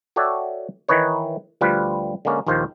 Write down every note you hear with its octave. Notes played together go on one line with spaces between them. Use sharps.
F#4 A4 C#5 D5 E5 G5
D#3 E3 D#4 B4 C#5
D2 F3 G3 F4 B4
D3 G#3 A#3 C#4
A#1 D#2 D#3 F4 C5